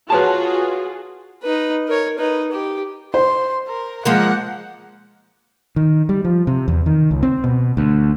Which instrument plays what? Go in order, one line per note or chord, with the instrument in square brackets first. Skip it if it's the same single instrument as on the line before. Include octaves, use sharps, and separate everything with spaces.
[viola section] F4 F#4 G#4 [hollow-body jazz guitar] B4 C#5 A5
[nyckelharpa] D#4 B4
A#4 C#5
D#4 B4
G4
[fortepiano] C5 [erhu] C6
[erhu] A#4
[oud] F3 G#3 A#3 [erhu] F#5
[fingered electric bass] D#3
G3
F3
C3
E2
D#3
C#2
C4
B2
D2